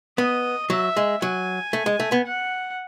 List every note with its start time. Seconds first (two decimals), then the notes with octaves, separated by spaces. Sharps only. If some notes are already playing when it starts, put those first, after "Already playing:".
0.18 B3 D#5
0.70 F#3 E5
0.97 G#3
1.22 F#3 G#5
1.73 A3
1.86 G#3
2.00 A3
2.12 B3
2.26 F#5